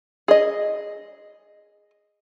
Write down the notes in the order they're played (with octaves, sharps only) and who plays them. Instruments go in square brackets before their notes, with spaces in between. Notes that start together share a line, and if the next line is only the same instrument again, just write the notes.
[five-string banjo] G#4 D#5